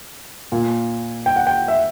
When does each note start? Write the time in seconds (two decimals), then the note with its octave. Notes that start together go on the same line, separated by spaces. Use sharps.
0.52 A#2
1.26 G5
1.36 F#5
1.47 G5
1.68 E5